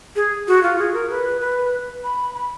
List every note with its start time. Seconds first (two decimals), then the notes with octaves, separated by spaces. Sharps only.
0.16 G#4
0.48 F#4
0.63 F4
0.79 G#4
0.94 A#4
1.10 B4
1.41 B4
2.04 B5
2.35 B5